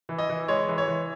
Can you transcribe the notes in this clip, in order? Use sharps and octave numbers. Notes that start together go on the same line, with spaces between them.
E3
D#5
E3
G#3 C#5
E3
C#5
E3